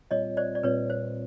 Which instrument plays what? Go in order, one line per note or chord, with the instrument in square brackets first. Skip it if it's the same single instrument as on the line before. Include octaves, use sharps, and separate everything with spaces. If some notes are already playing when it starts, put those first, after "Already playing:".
[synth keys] A#2 G3 C4 F4 [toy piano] C#5 D#5
[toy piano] C5 D5
D5
[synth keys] A#2 G3 C4 F4 [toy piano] B4 C#5
[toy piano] C5